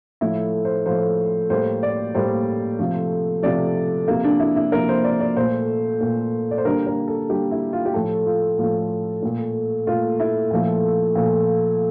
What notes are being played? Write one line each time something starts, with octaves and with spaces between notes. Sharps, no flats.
A2 F3 A3 E4
C5
A2 F3 A3 C5
A2 G3 A#3 C5
D5
A2 G3 A#3 C5
C3 F3 A3
C3 F3 A3 D5
C3 F3 A#3
D4
E4
E4
C3 F3 A#3 A#4
C5
D5
D5
A#2 A3 C5
A#2 A3
D5
C5
D3 G3 A#3 A#4
A#4
A4
D3 G3 A#3 G4
E4
F4
G4
A2 F3 A3 A4
F4
A2 F3 A3
A#2 A3
A#2 A3 F4
E4
A#2 F3 A3
A#2 F3 A3